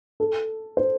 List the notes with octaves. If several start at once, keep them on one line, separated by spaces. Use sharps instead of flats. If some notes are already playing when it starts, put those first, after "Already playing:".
A4
C5